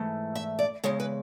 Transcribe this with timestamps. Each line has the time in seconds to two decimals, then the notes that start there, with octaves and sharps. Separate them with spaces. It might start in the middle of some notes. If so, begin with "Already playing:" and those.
Already playing: G#2 E3 A3
0.35 E5
0.59 D5
0.84 E2 C#3 G#3 C#5
1.00 B4